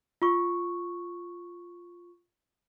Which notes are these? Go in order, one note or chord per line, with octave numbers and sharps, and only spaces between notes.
F4 C#6